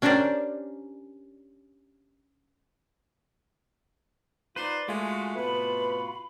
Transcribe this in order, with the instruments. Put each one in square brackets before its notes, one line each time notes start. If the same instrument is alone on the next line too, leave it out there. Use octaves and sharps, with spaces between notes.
[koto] C#4 D4 G4 A#4 C5 D5
[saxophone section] D#4 F4 C5 [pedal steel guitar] B4 D5
[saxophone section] G#3 A3 [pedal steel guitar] F4 F#4 [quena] G#5
[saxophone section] A2 C3 B3 [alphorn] B4 [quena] B5